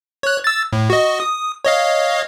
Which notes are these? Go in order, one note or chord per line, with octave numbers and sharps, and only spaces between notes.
C#5 F#6
E6 A6
A2
F#4 D#5
D#6
C#5 D#5 F5